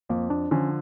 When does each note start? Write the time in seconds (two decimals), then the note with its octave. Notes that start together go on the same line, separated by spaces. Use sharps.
0.10 F2 A#3
0.30 D4
0.51 D3 F3 C#4